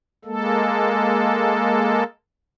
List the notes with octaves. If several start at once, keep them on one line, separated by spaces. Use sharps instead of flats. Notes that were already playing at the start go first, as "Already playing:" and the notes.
G#3 A#3 A4